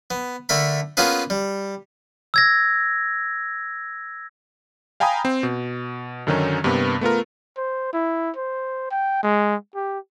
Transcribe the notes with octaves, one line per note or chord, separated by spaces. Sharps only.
B3
D3 A3 A#4 B5
A#3 B3 C#4 F4 G#4 B4
G3
E6 G#6 A#6
F5 G5 G#5 A#5 B5 D#6
C4
B2
F#2 D3 D#3 F#3 C#4 D#4
G2 C3 A#3 B3
A3 B3 F4 A#4
C5
E4
C5
G5
G#3
G4